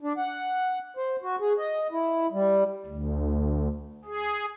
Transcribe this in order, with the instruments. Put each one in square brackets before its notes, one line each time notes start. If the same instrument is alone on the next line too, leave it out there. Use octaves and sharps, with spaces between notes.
[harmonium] D4
F#5
C5
F#4
G#4
D#5
E4
G3
[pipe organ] D2
G#4